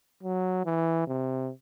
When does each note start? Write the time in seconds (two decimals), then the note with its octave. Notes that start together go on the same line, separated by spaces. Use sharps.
0.23 F#3
0.65 E3
1.07 C3